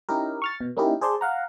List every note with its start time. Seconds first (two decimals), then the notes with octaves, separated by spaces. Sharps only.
0.09 C#4 D#4 E4 G4 A#4
0.42 C#6 F6 A6
0.61 B2
0.77 A#3 C#4 D#4 E4 G4 A#4
1.01 G#4 C5 D5 A5 C6
1.21 F5 F#5 A#5